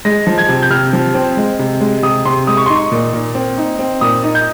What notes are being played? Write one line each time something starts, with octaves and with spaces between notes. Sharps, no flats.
G#3 A#6
F3
G#6
C3
G6
C3 F6
F3
C4
G#3
C3
G#3
C3 D#6
C3 C6
G#3 D#6
C#6
D#4 C6
C#6
A#2
A#2
C4
D#4
C4
A#2 D#6
D#4
G6